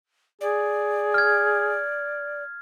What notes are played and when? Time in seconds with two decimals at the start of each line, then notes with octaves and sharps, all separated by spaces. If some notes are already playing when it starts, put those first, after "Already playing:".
0.41 G#4 D5
1.14 F6 G#6